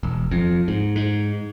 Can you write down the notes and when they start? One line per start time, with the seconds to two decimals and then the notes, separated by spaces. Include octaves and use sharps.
0.03 E1
0.31 F2
0.68 G#2
0.96 G#2